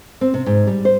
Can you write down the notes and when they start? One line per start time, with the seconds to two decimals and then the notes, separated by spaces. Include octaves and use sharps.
0.21 C4
0.34 C3
0.46 G#2
0.67 G3
0.85 C5